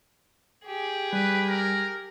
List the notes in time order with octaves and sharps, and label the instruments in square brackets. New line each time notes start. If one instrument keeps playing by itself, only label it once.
[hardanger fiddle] G4 G#4
[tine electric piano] G3 [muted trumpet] B4
[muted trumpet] A#4